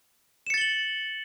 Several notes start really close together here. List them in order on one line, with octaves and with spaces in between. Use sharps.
E7 C#7 A6 G7 F#7